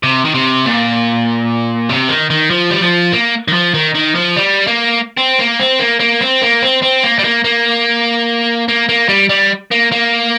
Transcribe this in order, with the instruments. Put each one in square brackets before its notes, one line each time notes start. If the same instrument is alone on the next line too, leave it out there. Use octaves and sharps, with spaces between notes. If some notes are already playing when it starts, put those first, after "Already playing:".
[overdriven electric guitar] C3
D#3
C3
A#2
C3
D#3
D#3
F3
G3
F3
A#3
D#3
F3
D#3
D#3
F3
G3
A#3
C4
A#3
C4
A#3
A#3
C4
A#3
C4
C4
A#3
G3
A#3
A#3
A#3
A#3
G3
G3
A#3
A#3